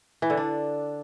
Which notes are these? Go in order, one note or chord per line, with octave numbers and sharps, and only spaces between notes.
E3
D3
D4